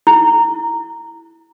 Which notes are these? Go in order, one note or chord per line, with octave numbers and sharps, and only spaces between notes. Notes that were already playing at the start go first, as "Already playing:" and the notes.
E4